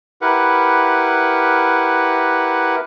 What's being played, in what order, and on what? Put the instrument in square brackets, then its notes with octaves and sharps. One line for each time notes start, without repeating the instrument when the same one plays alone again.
[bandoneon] E4 G4 A#4 B4 F#5